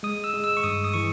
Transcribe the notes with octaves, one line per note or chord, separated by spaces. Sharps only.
G#3 D#6
E6
G#3
E6
C#6
G2 D#6
D#6
E3 C#6